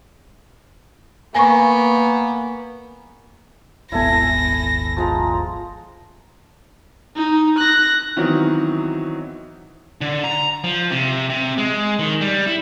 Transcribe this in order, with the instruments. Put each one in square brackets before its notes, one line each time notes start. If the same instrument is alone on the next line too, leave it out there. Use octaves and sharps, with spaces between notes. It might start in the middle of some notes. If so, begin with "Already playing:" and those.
[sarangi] A#3 [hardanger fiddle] B3 [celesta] G#5 C#6
[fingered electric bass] D#1 G#1 B3 [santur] E4 A4 G#5 [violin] A#6
[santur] F3 G#3 A#5
[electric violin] D#4
F#6 A#6
[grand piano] D#3 E3 F#3 B3 C4 D#4
[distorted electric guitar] D3
A#5
F3
C3
C3
G#3
D#3
G3
E4